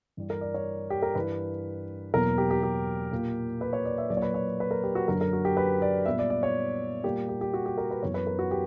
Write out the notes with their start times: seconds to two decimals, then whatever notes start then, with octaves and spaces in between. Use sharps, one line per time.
0.17 G2 E3 G3
0.30 A#4
0.41 D5
0.54 C#5
0.90 G4
1.02 A#4
1.15 G2 E3 G3 B4
2.14 E2 B2 F#3 A#3 A#4
2.38 G4
2.51 G4
2.63 G4
3.12 A#2 A#3
3.61 B4
3.73 C#5
3.85 D5
3.98 E5
4.10 A#2 F#3 A#3 D5
4.17 C#5
4.22 B4
4.34 C#5
4.47 D5
4.60 B4
4.71 A#4
4.83 G4
4.95 F#4
5.08 F#2 D3 F#3 A#4
5.21 A#4
5.33 F#4
5.45 G4
5.57 B4
5.82 D5
6.06 A#2 G3 B3 E5
6.19 D5
6.30 D5
6.43 C#5
7.04 A#2 G3 A#3 G4
7.29 G4
7.41 G4
7.54 F#4
7.66 G4
7.78 A#4
7.91 B4
8.03 F#2 E3 B3 C#5
8.14 B4
8.27 A#4
8.39 F#4
8.51 G4